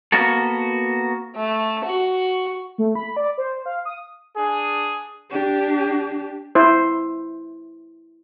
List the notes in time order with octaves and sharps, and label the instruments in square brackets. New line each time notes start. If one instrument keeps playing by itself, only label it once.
[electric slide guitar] A#3 B3 F#4 A4
[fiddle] A3
F#4
[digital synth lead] A3
B5
D5
C5
F5
D#6
[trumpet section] D4 G#4
[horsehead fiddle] D4 G4
[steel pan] E4 C5